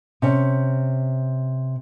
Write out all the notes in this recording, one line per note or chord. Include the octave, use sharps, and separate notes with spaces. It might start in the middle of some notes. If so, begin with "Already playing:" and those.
C3 C#4